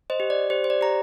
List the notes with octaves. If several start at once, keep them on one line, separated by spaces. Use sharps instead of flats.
C5 D#5
G4
D5
G4 C5
C5
D5
G4 A#5